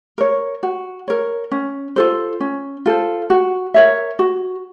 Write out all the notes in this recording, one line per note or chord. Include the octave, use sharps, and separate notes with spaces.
A#4 C#5
F#4
A#4 C#5
C#4
F4 A4 C5
C#4
F4 A4 C5
F#4
A#4 C#5 E5
F#4